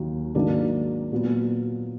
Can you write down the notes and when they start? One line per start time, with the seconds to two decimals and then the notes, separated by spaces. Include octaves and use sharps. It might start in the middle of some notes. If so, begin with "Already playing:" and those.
Already playing: D#2 D#3 F#3
0.35 G#2 D#3 F#3 A#3 D4
1.11 A#2 F#3 B3